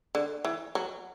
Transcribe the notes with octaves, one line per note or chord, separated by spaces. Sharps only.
D3
E3
F#3